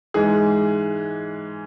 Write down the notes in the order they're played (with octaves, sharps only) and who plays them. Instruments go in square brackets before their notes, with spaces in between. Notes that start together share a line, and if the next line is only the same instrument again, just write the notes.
[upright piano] G#2 E3 G#3 G#4